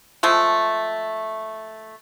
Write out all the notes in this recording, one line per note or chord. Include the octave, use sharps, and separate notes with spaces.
F3 G#3 A3